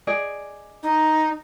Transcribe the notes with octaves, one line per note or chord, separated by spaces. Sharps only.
G#4 D5 D#5
D#4